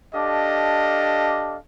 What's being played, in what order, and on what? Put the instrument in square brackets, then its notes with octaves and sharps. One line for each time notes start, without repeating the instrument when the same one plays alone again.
[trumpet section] D4 G4 A4 D#5 F5